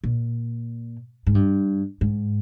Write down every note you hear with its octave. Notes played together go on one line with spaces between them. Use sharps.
A#2
G#2
G2
G#2